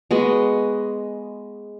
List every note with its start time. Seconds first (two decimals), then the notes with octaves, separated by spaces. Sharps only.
0.11 G#3 B3 F#4 D#5